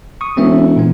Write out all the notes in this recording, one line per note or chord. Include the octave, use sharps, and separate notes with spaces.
C#6 D#6
E1 C4 C#4 E5
A#2 E3 B3